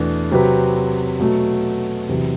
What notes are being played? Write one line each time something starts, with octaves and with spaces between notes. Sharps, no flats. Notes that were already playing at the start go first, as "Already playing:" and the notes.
Already playing: E2 B2 A3 D4
C3 F#3 C4 G4 B4
B2 F#3 A3
E2 C3 F#3